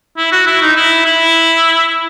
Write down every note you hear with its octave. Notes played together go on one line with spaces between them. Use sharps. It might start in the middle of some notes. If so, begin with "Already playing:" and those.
E4
F#4
E4
D#4
E4
E4